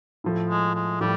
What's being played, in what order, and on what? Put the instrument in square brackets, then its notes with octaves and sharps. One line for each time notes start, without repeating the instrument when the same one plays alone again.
[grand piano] A2 F3 A3
[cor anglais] G#3
G#3
[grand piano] A2 F3 [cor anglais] G3